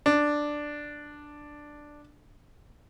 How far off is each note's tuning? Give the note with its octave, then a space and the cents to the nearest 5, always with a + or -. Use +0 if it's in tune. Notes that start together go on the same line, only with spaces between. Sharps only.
D4 +5